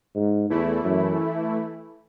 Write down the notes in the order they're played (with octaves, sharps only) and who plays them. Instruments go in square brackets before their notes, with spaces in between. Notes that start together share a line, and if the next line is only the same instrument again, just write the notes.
[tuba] G#2
[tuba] E2 [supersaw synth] E3 A3 E4
[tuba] F#2